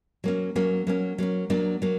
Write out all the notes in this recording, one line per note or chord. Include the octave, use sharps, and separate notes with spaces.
F#3 A#3 C#4
F#3 A#3 C#4
F#3 A#3 C#4
F#3 A#3 C#4
F#3 A#3 D4
F#3 A#3